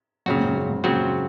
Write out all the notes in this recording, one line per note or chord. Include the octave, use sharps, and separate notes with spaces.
F#2 A#2 C#3 F#3 C4 F#4
G#2
F#2
G#2
F#2 A#2 C#3 F#3 C4 F#4